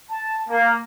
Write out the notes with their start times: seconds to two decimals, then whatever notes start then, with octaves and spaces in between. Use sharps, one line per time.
0.11 A5
0.49 A#3